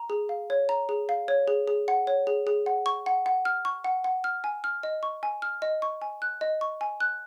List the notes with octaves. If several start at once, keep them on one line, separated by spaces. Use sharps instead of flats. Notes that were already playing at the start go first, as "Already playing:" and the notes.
Already playing: A#5
G#4
F5
C#5
A#5
G#4
F5
C#5
G#4
G#4
F#5
C#5
G#4
G#4
F#5
C#6
F#5
F#5
F6
C#6
F#5
F#5
F6
G#5
F6
D#5
C#6
G#5
F6
D#5
C#6
G#5
F#6
D#5
C#6
G#5
F#6